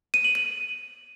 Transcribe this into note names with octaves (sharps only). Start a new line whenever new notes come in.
D#7
F#7
D#7